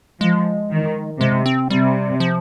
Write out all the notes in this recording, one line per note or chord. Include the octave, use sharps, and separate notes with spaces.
F3 G#3
D#3
C3 G#3
C4
C3 G3
F3